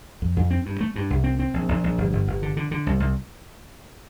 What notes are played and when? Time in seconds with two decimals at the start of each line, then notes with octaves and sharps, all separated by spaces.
0.22 F2
0.37 F2
0.51 C4
0.66 G2
0.81 A3
0.96 G2
1.10 C2
1.24 C4
1.39 C4
1.54 A#1
1.69 A#1
1.84 A#1
1.98 G1
2.13 G1
2.27 G1
2.42 D3
2.57 D3
2.71 D3
2.87 C2
3.00 C2